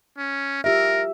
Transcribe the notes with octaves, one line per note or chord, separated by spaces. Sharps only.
C#4
F4 G4 A#4 E5